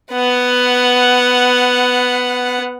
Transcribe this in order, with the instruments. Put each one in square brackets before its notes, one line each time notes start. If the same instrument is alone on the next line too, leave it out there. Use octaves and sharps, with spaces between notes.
[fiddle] B3 F#5